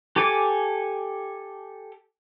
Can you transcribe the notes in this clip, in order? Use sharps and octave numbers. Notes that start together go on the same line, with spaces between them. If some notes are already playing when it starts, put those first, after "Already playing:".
G4 A4 G#5 D6